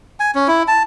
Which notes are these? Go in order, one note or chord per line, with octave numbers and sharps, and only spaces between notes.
G#5
C#4
E4
A5